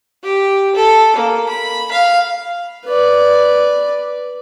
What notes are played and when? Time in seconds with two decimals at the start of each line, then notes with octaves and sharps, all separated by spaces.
0.24 G4
0.75 A4
1.16 A#3
1.48 B5
1.91 F5
2.86 B4 D5